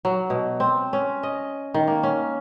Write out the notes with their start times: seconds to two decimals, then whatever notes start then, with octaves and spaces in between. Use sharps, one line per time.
0.05 F#3
0.30 B2
0.60 C4
0.93 C#4
1.23 D#5
1.74 D#3
1.87 A#3
2.03 C#4